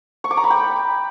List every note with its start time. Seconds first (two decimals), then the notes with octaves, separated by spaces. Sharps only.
0.24 C#6
0.31 D6
0.37 A#5
0.44 B5
0.50 G5